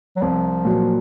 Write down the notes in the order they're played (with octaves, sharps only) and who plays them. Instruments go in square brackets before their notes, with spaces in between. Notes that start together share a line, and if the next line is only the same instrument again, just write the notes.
[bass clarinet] F#3
[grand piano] C2 [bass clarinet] F3
[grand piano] A#2 F#3